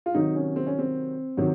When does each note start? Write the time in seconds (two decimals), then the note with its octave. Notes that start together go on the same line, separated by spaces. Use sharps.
0.06 F4
0.15 C3 D#3 F#3 D#4
0.35 C#4
0.56 C4
0.67 C#4
0.79 C4
1.37 C3 D#3 F#3